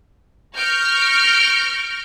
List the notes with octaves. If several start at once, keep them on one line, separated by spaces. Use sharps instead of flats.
C#6 F6 G6 A#6 D7